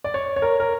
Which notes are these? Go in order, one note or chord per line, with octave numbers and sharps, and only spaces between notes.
D5
C#5
C#5
A#4
A#4